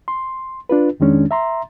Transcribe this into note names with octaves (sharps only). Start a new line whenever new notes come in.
C6
D4 F4 B4
F2 D#3 G#3 C#4 D4
E5 A#5 C6